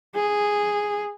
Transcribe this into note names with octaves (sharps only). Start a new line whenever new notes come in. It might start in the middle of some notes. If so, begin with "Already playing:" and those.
G#4